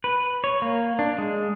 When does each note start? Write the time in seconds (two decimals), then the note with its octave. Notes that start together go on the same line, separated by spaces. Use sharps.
0.04 B4
0.44 C#5
0.62 A#3
0.99 D4
1.19 G#3